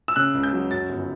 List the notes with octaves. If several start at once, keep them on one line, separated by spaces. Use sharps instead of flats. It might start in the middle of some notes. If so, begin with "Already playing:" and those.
E6
C#3 F#6
C#2
G6
F#3
F#2 A6
G1